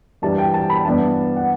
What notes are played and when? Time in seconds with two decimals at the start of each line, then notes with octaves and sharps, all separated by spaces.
0.22 G2 E3 G3 A5
0.38 G5
0.54 A5
0.70 B5
0.85 G2 E3 B3 D4 A5
1.36 F#5